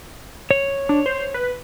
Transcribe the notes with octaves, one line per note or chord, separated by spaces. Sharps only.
C#5
D4
C5
B4